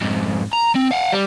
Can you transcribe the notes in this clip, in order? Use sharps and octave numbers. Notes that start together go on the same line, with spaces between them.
F2 G#2
A#5
C4
F5 F#5
G3